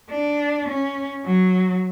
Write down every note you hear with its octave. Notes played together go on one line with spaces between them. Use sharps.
D4
C#4
F#3